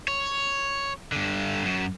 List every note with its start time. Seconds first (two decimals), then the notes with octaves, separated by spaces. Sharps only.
0.08 C#5
1.12 G2 D3
1.65 F#2